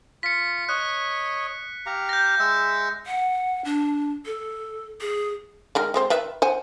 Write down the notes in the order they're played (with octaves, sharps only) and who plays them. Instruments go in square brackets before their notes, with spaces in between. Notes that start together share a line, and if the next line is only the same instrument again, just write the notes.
[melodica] F4 [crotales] B6 C#7
[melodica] C#5 D#5 [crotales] F#6
[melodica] G4 F5 A#5
[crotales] G6 A#6
[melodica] G#3 E5 E6
[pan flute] F#5
D4
A4
G#4
[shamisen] D#3 G#3 A#4
G#3 C4 C5
D#3 B4 E5
C5 F#5 G#5